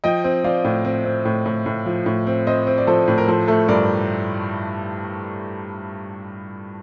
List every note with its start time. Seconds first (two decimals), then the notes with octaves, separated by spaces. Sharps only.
0.04 F3 D#5 G5
0.24 C4
0.44 F3 D5 F5
0.65 A2
0.85 C4
1.05 C4
1.25 A2
1.46 A2
1.66 A2
1.86 F3
2.06 A2
2.27 C4
2.47 C4 C5 D#5
2.67 C4
2.78 D5
2.87 F3 A4 C5
3.08 A2
3.18 A#4
3.28 F3 A4 C5
3.48 A3 A4
3.68 G2 A#4 D5